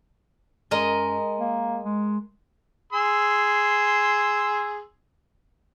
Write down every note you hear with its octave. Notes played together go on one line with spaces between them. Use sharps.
F#2 G#3 A#4 D#5
A#3
G#3
G#4 C6 E6